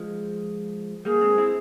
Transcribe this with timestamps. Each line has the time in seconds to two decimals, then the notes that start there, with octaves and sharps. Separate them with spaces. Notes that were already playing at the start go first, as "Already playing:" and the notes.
Already playing: F3 G#3
1.05 G3 A#3 G#4
1.21 G#3 C4
1.38 C4 E4